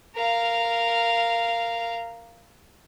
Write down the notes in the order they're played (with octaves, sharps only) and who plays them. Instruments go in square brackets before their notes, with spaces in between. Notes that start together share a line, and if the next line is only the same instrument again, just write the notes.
[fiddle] A#4 F5